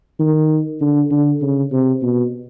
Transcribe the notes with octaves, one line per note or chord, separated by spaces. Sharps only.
D#3
D3
D3
C#3
C3
B2